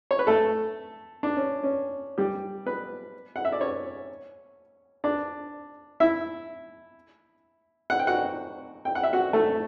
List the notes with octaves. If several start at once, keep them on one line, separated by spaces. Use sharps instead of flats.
C#5
B4
A3 A4
D4
C#4
C#4
G3 G4
B3 B4
F#5
E5
D5
C#4 C#5
D4 D5
E4 E5
F#5
G5
F#4 F#5
G5
F#5
E5
F#4 F#5
A3 A4